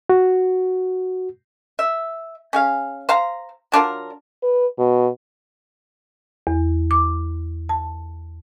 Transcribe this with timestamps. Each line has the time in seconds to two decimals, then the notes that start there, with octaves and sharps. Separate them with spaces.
0.09 F#4
1.79 E5
2.53 C#4 G#4 F5
3.09 C5 F5 A#5
3.72 F#3 D4 F4 A#4
4.43 B4
4.78 B2
6.47 E2
6.91 D6
7.69 A5